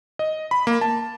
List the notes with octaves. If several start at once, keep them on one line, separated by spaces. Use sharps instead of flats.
D#5
B5
A#3
A5